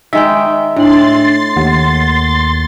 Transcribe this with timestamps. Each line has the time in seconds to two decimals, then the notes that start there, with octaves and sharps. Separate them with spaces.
0.13 D#3 G#3 E5 G5
0.76 A2 D4 C6 A6 F#7
1.56 D#2 F#5